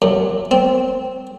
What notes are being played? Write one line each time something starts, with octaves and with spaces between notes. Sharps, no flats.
F#2
C4